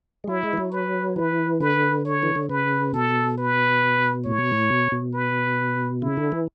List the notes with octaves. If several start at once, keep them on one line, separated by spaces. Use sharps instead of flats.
G#3
F#3 E4
G#3
E3
F#3
B4
E3 B4
D3 B4
C#5
E3
D3
C#3 B4
B2 A4
B4
A2 C#5
B2
A2
B2
B2
B4
C#3 E4
D3
E3